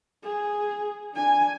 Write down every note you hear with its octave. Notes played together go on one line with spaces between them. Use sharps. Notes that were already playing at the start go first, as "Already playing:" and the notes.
G#4
D4 G#5